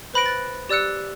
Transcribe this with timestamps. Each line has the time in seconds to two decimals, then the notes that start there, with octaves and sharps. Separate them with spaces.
0.14 B4 C5 B5 F#6 A#6 D7
0.26 F#6 A6
0.69 G4 D5 E6 F#6 C#7